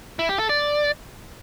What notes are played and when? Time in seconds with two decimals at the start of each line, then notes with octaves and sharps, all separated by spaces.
0.19 E4
0.29 G4
0.39 A4
0.49 D5